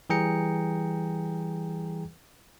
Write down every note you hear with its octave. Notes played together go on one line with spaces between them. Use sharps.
E3 G3 G#4 G5 A#5 C#7